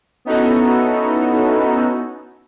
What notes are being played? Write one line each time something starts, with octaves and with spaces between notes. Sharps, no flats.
B3 C#4 D#4 E4 F#4 A4